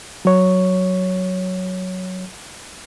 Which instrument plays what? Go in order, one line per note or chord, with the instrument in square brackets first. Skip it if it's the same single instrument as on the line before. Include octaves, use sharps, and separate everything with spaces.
[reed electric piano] F#3 C#5